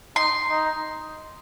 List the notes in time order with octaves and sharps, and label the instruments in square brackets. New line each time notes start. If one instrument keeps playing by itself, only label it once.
[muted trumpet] D#4 [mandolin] C6
[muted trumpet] D#4